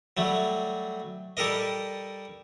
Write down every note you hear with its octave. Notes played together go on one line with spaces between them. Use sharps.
F#3 G3 A3
G3 G4 A4 A#4 D#5